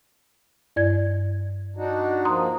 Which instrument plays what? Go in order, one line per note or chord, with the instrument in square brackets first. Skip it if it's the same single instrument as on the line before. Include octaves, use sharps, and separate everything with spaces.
[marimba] G2 D5 G#6
[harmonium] D4 D#4 F#4
[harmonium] F3 A#3 [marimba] A#5 C6 D#6